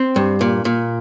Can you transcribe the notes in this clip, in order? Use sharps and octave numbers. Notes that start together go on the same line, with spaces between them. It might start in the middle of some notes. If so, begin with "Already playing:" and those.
Already playing: C4
G2
A#2
A#2